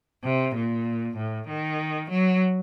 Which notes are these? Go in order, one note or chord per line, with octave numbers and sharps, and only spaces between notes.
C3
A#2
A2
D#3
F#3